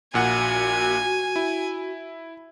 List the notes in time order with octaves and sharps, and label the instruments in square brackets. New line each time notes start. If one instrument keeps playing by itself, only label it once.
[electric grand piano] A#1 A#2 F#5 [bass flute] F#4 [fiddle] G#5
[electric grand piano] E4